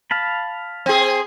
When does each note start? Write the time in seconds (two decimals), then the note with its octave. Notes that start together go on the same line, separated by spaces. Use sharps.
0.11 F5 A5 B5
0.86 C4 G#4